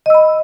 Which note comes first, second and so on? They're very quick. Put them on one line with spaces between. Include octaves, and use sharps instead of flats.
D#5 E6 B5